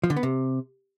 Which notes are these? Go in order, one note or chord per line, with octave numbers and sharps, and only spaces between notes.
F3
D3
B3
C3